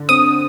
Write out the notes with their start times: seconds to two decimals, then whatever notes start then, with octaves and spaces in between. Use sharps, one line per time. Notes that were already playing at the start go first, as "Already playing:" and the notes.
Already playing: D3
0.09 C4 D#6